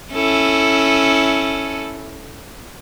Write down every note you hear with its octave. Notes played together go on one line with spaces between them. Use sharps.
C#4 E4 A4